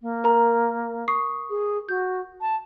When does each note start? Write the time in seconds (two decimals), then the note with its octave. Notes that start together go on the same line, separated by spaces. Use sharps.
0.01 A#3
0.24 A#4 A#5
1.08 C#6 D#6 C7
1.50 G#4
1.89 F#4 G6
2.41 A5